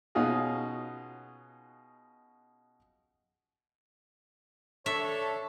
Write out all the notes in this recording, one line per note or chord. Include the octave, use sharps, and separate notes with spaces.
B2 C#4 D#4 F4 F#4 G#4
D4 A4 C#5 E5